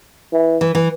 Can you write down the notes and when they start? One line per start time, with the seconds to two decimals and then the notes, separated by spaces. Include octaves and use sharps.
0.32 E3
0.61 E3
0.75 E3